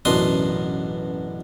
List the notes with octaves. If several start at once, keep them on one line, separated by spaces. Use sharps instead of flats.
A1 F#2 B2 D4 C6 D#6